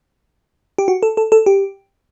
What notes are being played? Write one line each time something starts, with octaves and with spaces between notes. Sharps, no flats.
G4
F#4
A4
A4
A4
G4